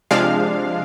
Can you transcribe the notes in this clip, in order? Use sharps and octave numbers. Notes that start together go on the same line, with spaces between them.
C3 F3 G#3 D4 F5